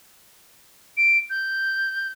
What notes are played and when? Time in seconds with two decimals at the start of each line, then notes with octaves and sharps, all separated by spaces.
0.97 D7
1.30 G6